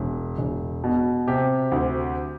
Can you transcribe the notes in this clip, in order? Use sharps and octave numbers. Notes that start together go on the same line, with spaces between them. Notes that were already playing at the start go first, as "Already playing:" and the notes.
Already playing: E1
E1
B2
C3 G4
D2